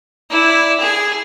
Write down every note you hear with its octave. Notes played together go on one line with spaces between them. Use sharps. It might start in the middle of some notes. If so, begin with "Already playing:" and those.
E4 D5
G#4